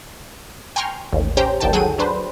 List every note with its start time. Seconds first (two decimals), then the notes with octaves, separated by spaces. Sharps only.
0.76 G5 G#5 A#5 C6 C#6 F6
1.13 A1 D#2
1.37 C#4 G4 C5 G5 A#5
1.60 G1 D2 D#3 G5 A5
1.73 F#3 G#4 A4 F#5 G5 D#7
1.98 F#3 D4 B4 C5